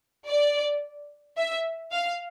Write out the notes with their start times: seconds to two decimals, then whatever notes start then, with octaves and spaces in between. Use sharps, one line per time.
0.28 D5
1.38 E5
1.92 F5